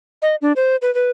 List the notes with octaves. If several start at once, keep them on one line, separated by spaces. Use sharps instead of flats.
D#5
D4
C5
B4
B4